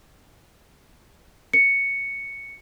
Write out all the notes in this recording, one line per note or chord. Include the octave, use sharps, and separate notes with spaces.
C#7